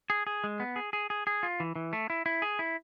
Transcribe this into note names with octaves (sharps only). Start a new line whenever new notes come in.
G#4
G#4
G#3
B3
G#4
G#4
G#4
G#4
F4
E3
E3
A3
E4
E4
G#4
E4